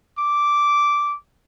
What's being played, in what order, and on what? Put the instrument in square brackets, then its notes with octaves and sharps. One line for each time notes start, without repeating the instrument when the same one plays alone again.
[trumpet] D6